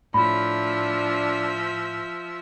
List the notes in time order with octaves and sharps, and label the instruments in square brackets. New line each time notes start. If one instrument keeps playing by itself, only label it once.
[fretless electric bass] A2 [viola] F3 E5 [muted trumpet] D4 [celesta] B5